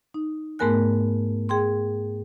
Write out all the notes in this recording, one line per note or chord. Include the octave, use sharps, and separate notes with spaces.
D#4
G#2 A3 B3 A#4 G#5 F#6
G#4 G5 C6